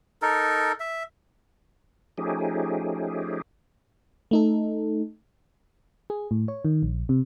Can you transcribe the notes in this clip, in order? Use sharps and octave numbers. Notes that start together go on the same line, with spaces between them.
D#4 A4 A#4
E5
F3 A3 C#4 D#4 G4 G#4
A3 D#4 A4
G#4
A2
C#5
D#3
A#1
C3